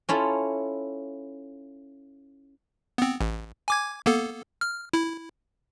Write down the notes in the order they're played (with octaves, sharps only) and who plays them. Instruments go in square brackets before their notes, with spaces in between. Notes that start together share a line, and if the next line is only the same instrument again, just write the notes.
[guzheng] C#4 E4 F4 A4
[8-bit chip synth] B3 C4
A1
G#5 D6 G#6
A#3 B3 A4
F6
E4